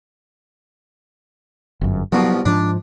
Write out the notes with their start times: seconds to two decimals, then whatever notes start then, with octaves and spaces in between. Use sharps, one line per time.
1.81 G1 F#2
2.12 C2 B2 F3 F#3
2.46 G#2 F3 D4